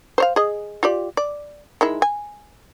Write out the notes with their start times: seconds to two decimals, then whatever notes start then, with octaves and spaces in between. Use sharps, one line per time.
0.18 C5 C#5 F5
0.36 G#4 D#5
0.83 F4 G4 D5
1.17 D5
1.81 D#3 G#3 E4
2.02 G#5